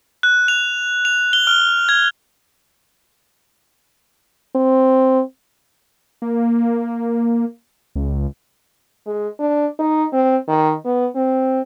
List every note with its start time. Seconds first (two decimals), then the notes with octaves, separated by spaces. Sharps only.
0.23 F#6
0.48 F7
1.05 F7
1.33 G7
1.47 F6
1.89 G#6
4.55 C4
6.22 A#3
7.95 C#2
9.06 G#3
9.39 D4
9.79 D#4
10.13 C4
10.48 D#3
10.85 B3
11.16 C4